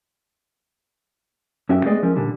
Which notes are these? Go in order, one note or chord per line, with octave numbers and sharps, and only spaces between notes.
F#2 C#4 F#4 E5 G5
G#3 A3 B3 G#4 D5 D#5
F3 C#4 E4 A#4
A#2 D3 G3